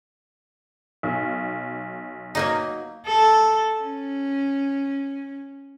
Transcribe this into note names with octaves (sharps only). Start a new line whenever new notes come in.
B1
F#3 A#3 D#4
A4
C#4